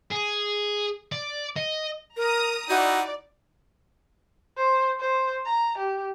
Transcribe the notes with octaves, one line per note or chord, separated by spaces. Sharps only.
G#4
D5
D#5
A#4 A#5 D#6
D#4 E4 F#4 D5
C5
C5
A#5
G4